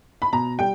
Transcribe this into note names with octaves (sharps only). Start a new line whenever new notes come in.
B5
B2 A#5
G3 G5